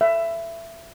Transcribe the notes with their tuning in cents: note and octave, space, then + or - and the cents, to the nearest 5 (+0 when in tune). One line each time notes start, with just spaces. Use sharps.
E5 +20